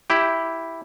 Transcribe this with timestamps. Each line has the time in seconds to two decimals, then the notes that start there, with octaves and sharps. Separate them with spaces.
0.10 E4 G4